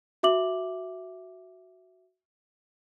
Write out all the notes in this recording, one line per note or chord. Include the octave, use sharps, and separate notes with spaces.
F#4 E5 D6 F#7